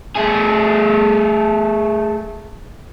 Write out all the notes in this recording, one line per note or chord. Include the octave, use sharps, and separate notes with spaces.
A3 G#4